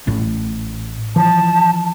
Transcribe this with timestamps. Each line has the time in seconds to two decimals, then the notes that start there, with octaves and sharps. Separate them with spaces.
0.07 A1 A2
1.16 E3 F3 A5